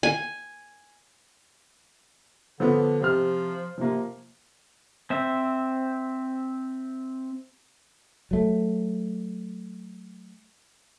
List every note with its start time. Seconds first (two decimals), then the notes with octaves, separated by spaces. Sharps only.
0.03 G#5
2.60 D3 F3 B3
3.01 C3 F3 F6
3.78 C3 F3 A#3
5.10 C4 E5
8.31 F#3 A3